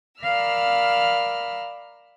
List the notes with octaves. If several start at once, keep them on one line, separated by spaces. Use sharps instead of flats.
A#4 D5 F5 B5 E6 F6